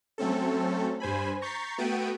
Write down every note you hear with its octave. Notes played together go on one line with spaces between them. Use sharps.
F#3 A3 C4 C#4 A4
G2 C5 G#5 B5
A#5 C#6 G6 A6 B6 C7
A3 B3 F#4 G5 D7 D#7